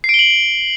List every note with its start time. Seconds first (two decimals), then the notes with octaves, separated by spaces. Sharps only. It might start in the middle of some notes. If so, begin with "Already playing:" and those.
0.04 C7
0.09 D7
0.14 G7
0.19 F#7